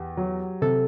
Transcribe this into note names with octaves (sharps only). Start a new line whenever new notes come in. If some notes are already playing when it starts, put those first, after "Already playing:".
Already playing: E2 G4
F#3
C3 A4